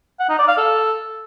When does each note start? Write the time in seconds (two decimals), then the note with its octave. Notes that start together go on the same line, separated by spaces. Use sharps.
0.20 F#5
0.29 D#4
0.39 D5
0.48 F5
0.57 A4